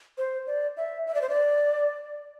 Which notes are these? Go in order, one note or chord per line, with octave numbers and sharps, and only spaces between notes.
C5
D5
E5
E5
D5
C5
D5